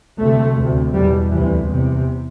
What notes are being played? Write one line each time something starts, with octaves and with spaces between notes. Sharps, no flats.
D2 C3 A3
D2 C3
E2 B2 G3
D2 C3 E3
E2 C3